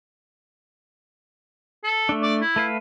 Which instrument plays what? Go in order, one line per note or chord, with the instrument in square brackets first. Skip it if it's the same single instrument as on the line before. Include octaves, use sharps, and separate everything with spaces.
[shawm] A4
[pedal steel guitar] A3 D4
[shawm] D5
E4
[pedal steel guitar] A3 B4 F5